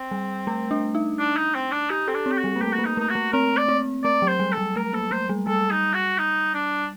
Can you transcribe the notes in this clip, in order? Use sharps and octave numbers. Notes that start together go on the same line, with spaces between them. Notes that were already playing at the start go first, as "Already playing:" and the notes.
Already playing: C4
G3
A3
D4
D#4
D4
D#4
C4
D4
D#4 G4
C4 A4
D4
C4
G4
F#4
G3
A#3
A3 G4
F#4
A#3
D#4
A3
D#4
F#4
A3
C4 A#4
D5
C4
A3 D5
F#3
C5
G3
A4
G3
A3 A#4
A#3 A4
A3 C5
G3
G3 A4
D#4
F#4
D#4
D4